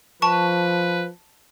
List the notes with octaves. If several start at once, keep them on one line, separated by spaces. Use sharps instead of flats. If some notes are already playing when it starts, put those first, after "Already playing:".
F3 B4 A5 C#6